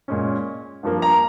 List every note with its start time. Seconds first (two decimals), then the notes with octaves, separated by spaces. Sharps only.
0.08 A#2 G#3 C#4
0.83 G2 F3 A#3
1.02 A#5